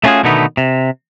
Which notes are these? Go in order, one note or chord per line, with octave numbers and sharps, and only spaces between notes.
A3 B3 C#4 F4 F#4 G#4
B2 D3 D#3 A3 B3 D#4
C3